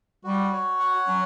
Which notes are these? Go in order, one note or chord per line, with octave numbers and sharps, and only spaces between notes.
G3 F#4
C#5
F#5
F#3 C#4